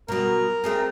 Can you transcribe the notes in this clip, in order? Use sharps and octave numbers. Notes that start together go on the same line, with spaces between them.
B2 F#3 A#4
A3 C4 G#4